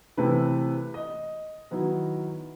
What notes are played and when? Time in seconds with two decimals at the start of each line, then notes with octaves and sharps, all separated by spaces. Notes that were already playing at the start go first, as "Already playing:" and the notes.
0.17 C3 E3 A3 E4 B4
0.94 D#5
1.71 D#3 F#3 B3 E4